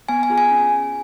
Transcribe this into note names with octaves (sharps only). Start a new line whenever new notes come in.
B3 G#5
G#5
F4 G#4
G#5
C#4